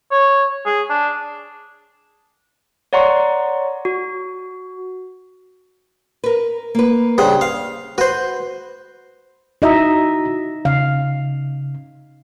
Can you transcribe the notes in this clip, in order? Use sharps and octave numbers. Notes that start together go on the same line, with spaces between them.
C#5
G#4
D4
C#5 D5 F#5 A#5 C6 C#6
F#4
A#4 B4
A#3 B4
G2 C#3 C5 F#5
F5
F#4 B4 C5
D#4 E4 F#4 D#5 E5 A#5
C#3 F5